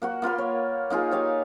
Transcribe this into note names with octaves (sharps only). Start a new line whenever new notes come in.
A#3 F#4 F#5
A#3 F4 B4 C6
C#5
A#3 D#4 F4 G#4
G4 C#5 F5 G#5